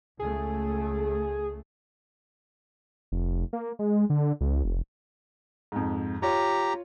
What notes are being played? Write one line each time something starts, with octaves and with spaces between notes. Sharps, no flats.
C#2 A3 G#4
F1
A#3
G#3
D3
C#2
F1
F2 G#2
F4 G4 C#5 A#5